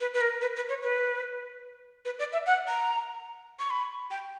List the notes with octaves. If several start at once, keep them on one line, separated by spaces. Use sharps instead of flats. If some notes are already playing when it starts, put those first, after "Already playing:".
B4
B4
A#4
B4
B4
C#5
B4
B4
D5
E5
F#5
A#5
C#6
B5
G5